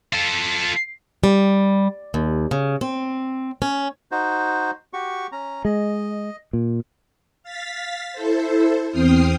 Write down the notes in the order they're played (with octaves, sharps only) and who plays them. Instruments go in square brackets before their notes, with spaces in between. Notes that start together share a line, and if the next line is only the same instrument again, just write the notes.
[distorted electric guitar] F4 A4
[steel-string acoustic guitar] G3
D#2
C#3
C4
C#4
[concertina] D#4 F#4 C5
F#4 G4 C#6
C#4 A#5
[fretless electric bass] G#3 [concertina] D#5
[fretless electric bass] A#2
[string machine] F5 A6 B6
E4 A4 C5
E2 C4 G5 D#6 F6 C7